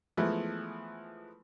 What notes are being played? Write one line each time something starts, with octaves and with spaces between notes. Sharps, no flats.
E3 F3 G#3 A3 B3